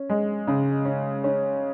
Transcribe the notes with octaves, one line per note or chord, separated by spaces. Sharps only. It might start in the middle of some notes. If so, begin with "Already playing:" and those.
Already playing: C#4
G#3
C#3
C#4
C#4